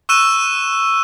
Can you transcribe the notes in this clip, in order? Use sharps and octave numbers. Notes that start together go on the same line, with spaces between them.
C#6 E6 F#6 D#7 E7